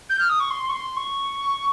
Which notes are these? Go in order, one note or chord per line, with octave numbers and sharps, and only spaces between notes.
G6
F6
D#6
C#6
C6
C#6
C6
C#6